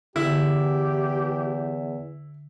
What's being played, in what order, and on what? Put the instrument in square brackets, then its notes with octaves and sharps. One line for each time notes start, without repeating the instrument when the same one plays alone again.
[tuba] E2 [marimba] D3 [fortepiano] E4 [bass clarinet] G4